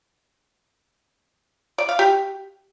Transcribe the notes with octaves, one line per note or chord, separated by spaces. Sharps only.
D5
F5
G4